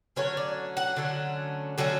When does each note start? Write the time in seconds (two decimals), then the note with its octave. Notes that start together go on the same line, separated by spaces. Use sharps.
0.16 D3 F#3 A3 C#4 C#5
0.37 D5
0.77 F#5
0.96 D3 F#3 A3 C#4
1.78 D3 F#3 A3 C#4